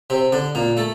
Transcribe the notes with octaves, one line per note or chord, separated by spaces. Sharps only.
C3 C4
D3 D4
A#2 A#3
A3 A4